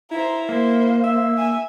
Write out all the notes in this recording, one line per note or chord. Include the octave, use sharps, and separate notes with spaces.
E4 C5 A#5
A#3 C5
E5
G#5